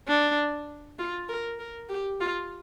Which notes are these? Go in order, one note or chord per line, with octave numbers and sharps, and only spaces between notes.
D4
F4
A#4
A#4
G4
F4